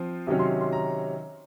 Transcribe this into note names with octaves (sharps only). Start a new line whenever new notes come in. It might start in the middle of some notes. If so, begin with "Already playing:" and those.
Already playing: F3 C4 F4
C3 D#3 F#3 C#4
C6
C6
A#5